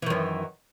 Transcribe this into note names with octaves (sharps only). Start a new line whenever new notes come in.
F#2 D#3 E3